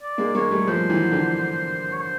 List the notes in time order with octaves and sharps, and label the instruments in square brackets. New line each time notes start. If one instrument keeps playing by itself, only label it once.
[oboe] D5
[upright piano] G#3 A#3
[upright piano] G#3 A#3 [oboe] C#5
[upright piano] G3 A3
[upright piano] F3 G3 [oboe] C5
[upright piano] E3 F#3
D3 E3
[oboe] C#5
C5